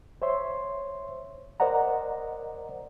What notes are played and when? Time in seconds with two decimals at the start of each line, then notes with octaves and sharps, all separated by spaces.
0.22 C5 C#5 E5 C6
1.60 A#4 C5 D5 D#5 F#5 A#5